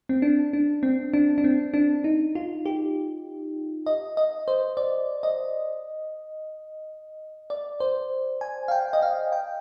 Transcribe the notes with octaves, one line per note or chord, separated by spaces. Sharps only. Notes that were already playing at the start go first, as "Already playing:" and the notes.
C4
D4
D4
C4
D4
D4
C4
D4
D#4
F4
G4
D#5
D#5
C5
D5
D#5
D5
C5
G#5
F5
G5
D#5
F5
G5